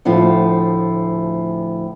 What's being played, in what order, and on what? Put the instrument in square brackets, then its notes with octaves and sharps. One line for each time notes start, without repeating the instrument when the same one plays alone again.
[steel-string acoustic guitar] D2 A2 F3 F4